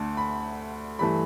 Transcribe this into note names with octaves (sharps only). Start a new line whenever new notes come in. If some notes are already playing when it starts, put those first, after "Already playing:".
Already playing: D2 D3 A3 A5
B5
G2 E3 A3 B5